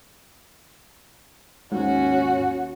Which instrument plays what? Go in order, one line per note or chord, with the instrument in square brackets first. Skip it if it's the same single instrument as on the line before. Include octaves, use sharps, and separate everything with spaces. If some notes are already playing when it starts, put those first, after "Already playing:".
[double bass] D#2 C#4 [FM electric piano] G#2 [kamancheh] F#4